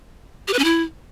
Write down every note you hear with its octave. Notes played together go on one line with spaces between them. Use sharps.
G4
B4
C#4
E4